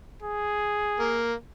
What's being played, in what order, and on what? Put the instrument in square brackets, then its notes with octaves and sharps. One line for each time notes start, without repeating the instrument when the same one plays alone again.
[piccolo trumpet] G#4
[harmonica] A#3